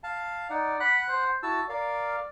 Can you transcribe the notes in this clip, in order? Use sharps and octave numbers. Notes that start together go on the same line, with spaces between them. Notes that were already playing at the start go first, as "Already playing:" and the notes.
F5 A5
D#4 D5 F#5
F#5 B5 F#6
C5
E4 F#4 A5 E6
A#4 D5 F5